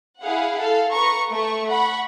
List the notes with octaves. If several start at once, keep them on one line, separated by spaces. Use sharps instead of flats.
E4 G#4 F5 F#5
A4 F5
B4 A#5 C#6
A3 C#6
F#5 B5 C#6